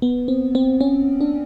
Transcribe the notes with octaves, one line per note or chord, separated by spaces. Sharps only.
B3
C4
C4
C#4
D4